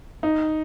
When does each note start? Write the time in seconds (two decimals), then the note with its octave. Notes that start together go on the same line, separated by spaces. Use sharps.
0.23 D#4